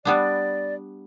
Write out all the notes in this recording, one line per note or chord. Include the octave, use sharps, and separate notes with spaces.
G3 B3 D4 D5